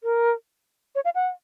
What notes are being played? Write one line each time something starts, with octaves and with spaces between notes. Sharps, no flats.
A#4
C#5
F5
F#5